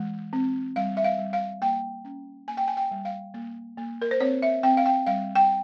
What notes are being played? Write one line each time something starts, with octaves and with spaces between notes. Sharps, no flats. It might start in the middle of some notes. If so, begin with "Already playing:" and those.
Already playing: E3 G#3
C4
G3 F5
E5
F5
G3
F5
A#3 G5
C#4
A#3 G#5
G5
G#5
G5
G3
F5
A#3
A#3
A#4
C5
C4 C#5
E5
C4 G5
F5
G5
G3 F5
G5